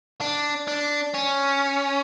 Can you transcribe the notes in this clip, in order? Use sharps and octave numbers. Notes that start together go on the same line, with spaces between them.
D4
D4
C#4